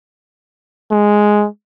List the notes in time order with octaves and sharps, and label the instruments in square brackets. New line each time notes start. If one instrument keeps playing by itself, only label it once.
[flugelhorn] G#3